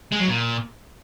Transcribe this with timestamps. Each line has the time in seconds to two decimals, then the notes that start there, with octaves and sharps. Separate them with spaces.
0.12 G#3
0.20 F#3
0.28 A#2